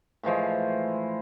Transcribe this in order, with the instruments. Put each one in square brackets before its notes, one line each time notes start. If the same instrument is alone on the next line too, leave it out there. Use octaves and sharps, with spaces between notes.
[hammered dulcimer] A2 E3 F3 G#3